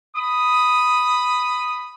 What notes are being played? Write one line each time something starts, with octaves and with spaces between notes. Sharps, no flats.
B5 D#6